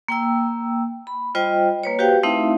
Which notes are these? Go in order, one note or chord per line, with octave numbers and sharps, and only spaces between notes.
A#3 G5 E6
B5
G3 F4 C5 D#5 G5
A#3 B4 C#5
F#4 G4 B4 C5 F5 G5
A3 C4 D#4 E4 E5 F5